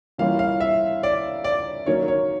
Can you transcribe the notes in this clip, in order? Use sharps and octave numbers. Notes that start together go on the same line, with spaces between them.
E3 G3 A#3 C#4 F4 F5
F5
E5
D5
D5
D#3 F#3 A#3 C#4 C#5
C#5